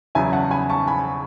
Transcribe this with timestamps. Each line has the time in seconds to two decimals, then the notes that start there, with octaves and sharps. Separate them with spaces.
0.15 E2 C#3 F#3 E5 G#5
0.33 F#5 A5
0.51 G#5 B5
0.70 A5 C#6
0.88 G#5 B5